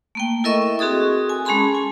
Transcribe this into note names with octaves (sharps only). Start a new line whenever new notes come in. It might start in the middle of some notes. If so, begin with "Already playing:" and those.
A3 A#3 G5
E4 A4 A#4 D#5 E5 C#6
C4 F#4 G#4 A4 D#6
G#5
G#3 C#4 G#4 A5 B5 C6
G#5